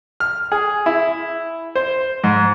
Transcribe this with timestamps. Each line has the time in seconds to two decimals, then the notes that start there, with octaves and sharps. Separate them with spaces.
0.20 F6
0.52 G#4
0.86 E4
1.75 C5
2.24 G#2